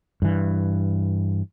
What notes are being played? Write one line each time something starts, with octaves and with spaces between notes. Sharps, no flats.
G2 E3